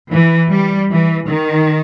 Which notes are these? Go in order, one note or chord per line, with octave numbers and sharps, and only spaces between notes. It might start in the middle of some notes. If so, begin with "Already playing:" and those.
E3
G3
E3
D#3